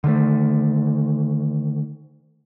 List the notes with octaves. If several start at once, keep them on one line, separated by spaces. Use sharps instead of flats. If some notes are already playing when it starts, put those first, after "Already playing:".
D3 D#3 G3 A3